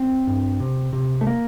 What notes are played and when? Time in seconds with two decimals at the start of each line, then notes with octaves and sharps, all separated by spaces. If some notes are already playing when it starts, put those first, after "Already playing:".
Already playing: C4
0.27 G2
0.60 C3
0.93 C3
1.21 A3
1.27 A#3